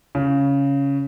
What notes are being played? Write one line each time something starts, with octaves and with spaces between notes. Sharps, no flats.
C#3